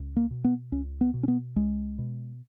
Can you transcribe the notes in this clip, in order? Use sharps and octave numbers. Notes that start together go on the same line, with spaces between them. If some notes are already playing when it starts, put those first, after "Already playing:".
Already playing: C#2
A#3
B2
B3
C#2 C#4
B3
B2
C#4
B3
C#2 G#3
B2